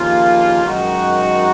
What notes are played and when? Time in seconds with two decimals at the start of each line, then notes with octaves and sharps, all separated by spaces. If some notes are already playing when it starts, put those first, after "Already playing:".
Already playing: D#2 C#3 F3 A#3 F4
0.65 F#2 D#3 G#3 D#4 F#4